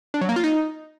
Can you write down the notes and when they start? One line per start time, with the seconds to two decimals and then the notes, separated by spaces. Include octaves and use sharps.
0.14 D4
0.21 F#3
0.29 A#3
0.36 F4
0.44 D#4